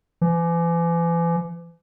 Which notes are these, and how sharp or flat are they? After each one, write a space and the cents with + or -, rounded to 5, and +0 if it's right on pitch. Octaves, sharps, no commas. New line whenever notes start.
E3 +40